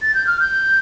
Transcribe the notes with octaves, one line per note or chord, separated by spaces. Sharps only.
A6
G6
F6
G6